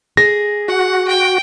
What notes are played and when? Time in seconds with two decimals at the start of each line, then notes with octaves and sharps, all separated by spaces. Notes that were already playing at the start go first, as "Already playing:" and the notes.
0.17 G#4 A#6
0.68 F#4 F#5
1.08 G5